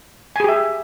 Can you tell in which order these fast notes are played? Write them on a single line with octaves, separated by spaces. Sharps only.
G#5 G#4 G4 E5